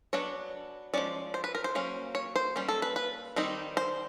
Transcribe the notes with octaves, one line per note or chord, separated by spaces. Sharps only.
F#3 B3 D4 C#5
F3 G#3 C#4 D5
C5
B4
A#4
C5
F#3 A#3 C#4
C#5
C5
G3 A#3 C#4
A4
B4
B4
D#3 G3 C4 D#4
C5